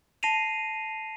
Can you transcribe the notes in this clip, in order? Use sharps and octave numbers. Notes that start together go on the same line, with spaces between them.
A5 A#6 C7 D#7 F7